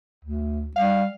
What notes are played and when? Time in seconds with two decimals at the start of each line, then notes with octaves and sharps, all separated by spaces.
0.25 D2
0.76 G3 F5